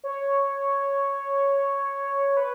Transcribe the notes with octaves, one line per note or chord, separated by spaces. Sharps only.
C#5
B4